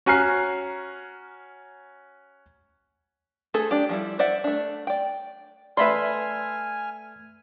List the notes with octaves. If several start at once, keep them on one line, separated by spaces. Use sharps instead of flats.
C#4 F#4 G#5 A#5 F6 C7
A3 C4 G#4 A4
D4 G4
F3 G3 E4
C5 D5 E5 F#5
A3 D4
D5 G5
A3 B4 D5 E5 G#5 B5 C6 F6